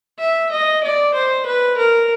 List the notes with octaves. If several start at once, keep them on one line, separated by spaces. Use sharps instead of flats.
E5
D#5
D5
C5
B4
A#4